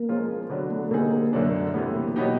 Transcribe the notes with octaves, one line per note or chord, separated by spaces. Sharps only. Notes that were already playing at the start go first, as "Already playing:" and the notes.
Already playing: A#3
F3 G#3 C#4 F4
D3 F#3 B3 D4 F#4
A3
D3 G3 A#3 C4 D#4 G#4
F#2 D3 F#3 A3 D4
C3 E3 G3 A3 B3
A#3
B2 F#3 B3 D#4 G4